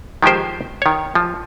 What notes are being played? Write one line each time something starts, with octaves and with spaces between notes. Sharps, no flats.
D#3 F3 G#3 G4 C5
D#3 C#5
F3